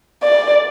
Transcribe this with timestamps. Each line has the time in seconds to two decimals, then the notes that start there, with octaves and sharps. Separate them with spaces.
0.23 D5